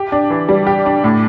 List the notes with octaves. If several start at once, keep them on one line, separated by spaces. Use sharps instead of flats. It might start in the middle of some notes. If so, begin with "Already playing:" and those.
Already playing: G4
D4
E3
G3
G4
D4
A2